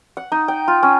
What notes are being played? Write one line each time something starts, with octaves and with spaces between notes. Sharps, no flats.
F#5
D#4
G5
F4
C#4